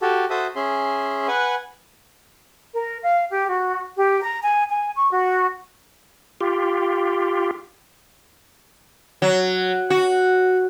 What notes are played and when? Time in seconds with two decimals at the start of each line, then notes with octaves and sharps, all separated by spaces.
0.02 F#4 G4 A4
0.30 F#4 A4 C5 E5 D#6
0.56 C#4 G#4 E5 C6
1.28 B4 F#5 G#5
2.73 A#4
3.02 F5
3.30 G4
3.47 F#4
3.97 G4
4.21 A#5
4.41 G#5
4.69 G#5
4.95 C#6
5.12 F#4
6.41 F4 G4
9.22 F#3
9.90 F#4